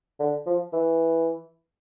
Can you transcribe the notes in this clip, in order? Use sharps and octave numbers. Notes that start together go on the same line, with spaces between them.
D3
F3
E3